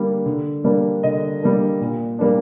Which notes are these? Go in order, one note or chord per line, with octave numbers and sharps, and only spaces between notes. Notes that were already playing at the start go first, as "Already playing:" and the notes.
Already playing: D3 G3 A#3
D3
G3 A#3 D4
D3 D#5
G3 A#3 D4
A#2
G3 A#3 D4